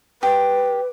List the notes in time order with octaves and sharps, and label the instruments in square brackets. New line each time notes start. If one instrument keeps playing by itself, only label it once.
[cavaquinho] G4 [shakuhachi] B4